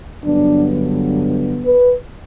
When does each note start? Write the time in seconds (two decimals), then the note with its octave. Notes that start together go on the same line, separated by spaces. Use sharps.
0.24 G2 D3 F#3 B3 D4
1.66 B4